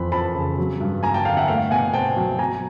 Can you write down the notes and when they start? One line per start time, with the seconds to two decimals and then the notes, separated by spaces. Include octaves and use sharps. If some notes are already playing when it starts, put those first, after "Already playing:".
Already playing: F2 E3 F3 B5
0.12 F2 A5 B5
0.35 C#3
0.58 F#3
0.81 G2
1.03 A#3 G#5 A#5
1.14 G5 A5
1.25 D3 F5 G5
1.37 E5 F#5
1.48 A3 F5 G5
1.71 B2 F#5 G#5
1.94 C4 G5 A5
2.16 F#3
2.39 F#3 G#5 A#5